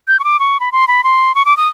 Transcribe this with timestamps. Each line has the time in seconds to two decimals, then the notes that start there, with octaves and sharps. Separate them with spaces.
0.08 G6
0.19 C#6
0.24 D6
0.40 C#6
0.60 B5
0.72 C6
0.88 B5
1.04 C6
1.35 C#6
1.45 D6
1.57 D#6